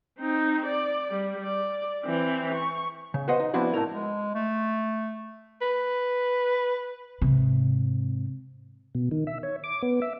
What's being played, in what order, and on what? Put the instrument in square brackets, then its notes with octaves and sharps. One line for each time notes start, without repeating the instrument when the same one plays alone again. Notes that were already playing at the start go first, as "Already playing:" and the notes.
[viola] C4 D#4
D5
G3
D5
E3 C4
C#6
[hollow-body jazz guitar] C#3
F#4 B4 C5 D#5 F#5
D#4
F3 B3 C4 D4 E4 F#4
A2 A3 E4 A#4
[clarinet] G#3
A3
[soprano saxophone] B4
[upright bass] G#2 C3
[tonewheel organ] B2
D#3
E5
C#5
D6
B3
E5